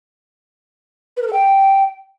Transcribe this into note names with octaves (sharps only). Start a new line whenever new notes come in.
B4
A#4
A4
G5